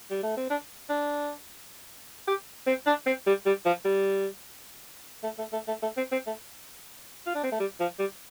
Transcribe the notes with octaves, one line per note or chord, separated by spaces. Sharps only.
G3
A3
C4
D4
D4
G4
C4
D4
C4
G3
G3
F3
G3
A3
A3
A3
A3
A3
C4
C4
A3
F4
D4
C4
A3
G3
F3
G3